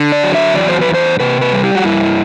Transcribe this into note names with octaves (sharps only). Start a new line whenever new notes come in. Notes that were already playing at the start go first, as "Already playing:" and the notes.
Already playing: D3
D5
F#3
E5
E2 D5
C5
B4
E2
C5
C3 B4
B4
G3
G4
F#4
G2 E4